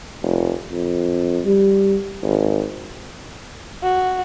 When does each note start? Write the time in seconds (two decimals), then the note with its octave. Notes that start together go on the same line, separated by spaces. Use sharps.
0.22 F1
0.71 F2
1.45 G3
2.23 G#1
3.83 F#4